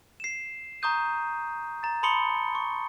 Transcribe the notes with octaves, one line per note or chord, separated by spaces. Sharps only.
C7 E7
A#5 C#6 D#6 G6 D#7
A#5 A6
A5 B5 C6 D#6 C#7 G7
C#6